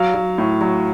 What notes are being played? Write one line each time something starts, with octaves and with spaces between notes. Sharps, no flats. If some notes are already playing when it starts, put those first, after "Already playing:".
Already playing: F#3 F5
F#3
A2
F#3